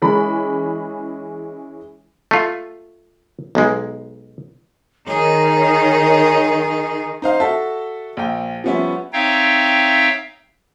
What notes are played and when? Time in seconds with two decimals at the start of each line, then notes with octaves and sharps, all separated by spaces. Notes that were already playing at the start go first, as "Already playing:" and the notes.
0.02 E3 G#3 C#4 B5
2.31 A3 F4
3.55 B1 G#3
5.08 D#3 D#4 G#4 C#5
7.22 D#4 C5 F5
7.40 F#4 A4 E5 A5
8.17 A#1 G5
8.64 F3 G3 B3 C#4 E5
9.13 C4 D#4 C#5 E5 F5 G5